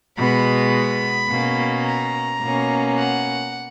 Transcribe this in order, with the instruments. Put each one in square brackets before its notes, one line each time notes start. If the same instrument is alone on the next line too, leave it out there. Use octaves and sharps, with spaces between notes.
[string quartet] B2 G#3 B3 B5
B2 A#3 C#4
A#5
B2 A#3 C#4
F#5